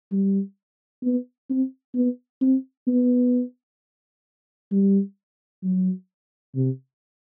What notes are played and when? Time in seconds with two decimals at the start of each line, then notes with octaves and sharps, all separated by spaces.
0.11 G3
1.03 B3
1.50 C4
1.95 B3
2.41 C4
2.87 B3
4.71 G3
5.63 F#3
6.55 C3